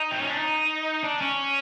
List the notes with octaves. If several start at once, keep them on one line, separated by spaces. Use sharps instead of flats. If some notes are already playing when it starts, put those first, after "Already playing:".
Already playing: D#4
C4
C#4
D4
D#4
D4
C#4